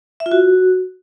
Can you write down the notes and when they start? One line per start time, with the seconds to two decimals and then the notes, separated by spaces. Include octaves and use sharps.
0.20 E5
0.26 F4
0.32 F#4